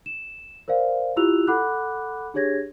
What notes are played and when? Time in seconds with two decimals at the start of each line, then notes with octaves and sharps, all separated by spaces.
0.06 E7
0.68 A#4 C5 D5 F5
1.16 E4 F4 G4 E6 F#6 F7
1.47 A4 F#5 B5 D6 F#6
2.34 D4 G4 G#4 C#5 G#6 A#6